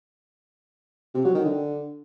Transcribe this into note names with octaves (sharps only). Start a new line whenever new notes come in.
C3
F#3
D#3
D3